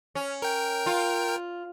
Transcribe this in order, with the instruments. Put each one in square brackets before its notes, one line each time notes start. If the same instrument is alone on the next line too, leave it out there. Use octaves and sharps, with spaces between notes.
[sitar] C#4
[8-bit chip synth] A#4 G5
[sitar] F4